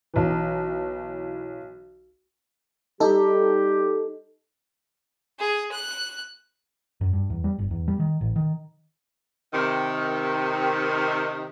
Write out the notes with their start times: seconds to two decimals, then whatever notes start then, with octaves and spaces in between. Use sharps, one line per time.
0.14 B1 E3
3.00 G3 D#4 G4 A4
5.39 G#4
5.72 F#6
7.01 F#2
7.13 G2
7.30 E2
7.44 G3
7.59 G1
7.71 E2
7.88 G3
8.00 D#3
8.21 A1
8.36 D#3
9.52 C3 D#3